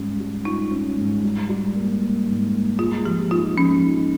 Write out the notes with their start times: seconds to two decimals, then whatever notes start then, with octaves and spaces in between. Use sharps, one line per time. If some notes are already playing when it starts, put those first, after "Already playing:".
Already playing: G#2 G3 C#4
0.20 G3
0.45 D#4 F4
0.71 C#4
0.97 G#2
1.23 G3
1.49 G3
1.76 A#3
2.01 A#3
2.27 G#2
2.53 A#3
2.79 G#3 F4
3.05 F3 G4
3.31 D#4 F4
3.57 F3 C#4
3.83 D#4